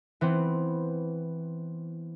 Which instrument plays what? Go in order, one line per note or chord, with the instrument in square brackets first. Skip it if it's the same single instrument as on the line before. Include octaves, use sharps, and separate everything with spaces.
[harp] E3 B3 C4